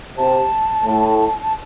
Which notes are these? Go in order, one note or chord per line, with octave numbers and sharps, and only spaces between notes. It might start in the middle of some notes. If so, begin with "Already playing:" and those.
C3 A5
A2
A5